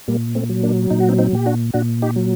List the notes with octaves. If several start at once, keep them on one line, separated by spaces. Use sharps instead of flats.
A#2 G3 A#3
A3 C4
F#3
A#3 D4
A#2 D#4
F#4
C4 D#4
C4 D#4
A#2 G4
D4 F#4
A#2 D4 F#4
D#4 G4
F#3